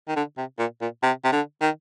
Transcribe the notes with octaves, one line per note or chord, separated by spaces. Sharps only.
D#3
D3
C3
A#2
A#2
C3
C3
D3
D#3